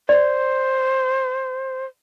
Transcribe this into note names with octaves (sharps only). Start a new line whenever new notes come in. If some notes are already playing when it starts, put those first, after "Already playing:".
C5 D5